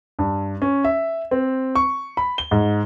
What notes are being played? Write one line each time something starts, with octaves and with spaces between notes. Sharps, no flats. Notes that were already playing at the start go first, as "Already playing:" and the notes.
G2
C#4
E5
C4
C#6
B5
G7
G#2